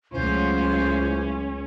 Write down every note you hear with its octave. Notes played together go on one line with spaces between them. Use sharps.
C#2 F#3 A3 C#4 F4 C5